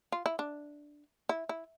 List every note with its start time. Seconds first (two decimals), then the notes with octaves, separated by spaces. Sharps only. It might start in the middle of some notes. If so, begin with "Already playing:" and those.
0.12 F4
0.26 E4
0.39 D4
1.29 E4
1.49 E4